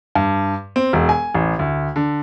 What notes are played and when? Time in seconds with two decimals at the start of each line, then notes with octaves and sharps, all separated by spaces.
0.15 G2
0.76 C4
0.93 E1
1.09 G#5
1.35 A1
1.59 D2
1.96 D3